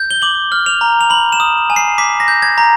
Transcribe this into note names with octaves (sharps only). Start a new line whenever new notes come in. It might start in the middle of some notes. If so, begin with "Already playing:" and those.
Already playing: G6
G7
D6 F#7
F6
F7
A#5
F7
B5 F#7
E7
D#6
G#5
C7
D6 B6
A#6
G6
G#6
A#5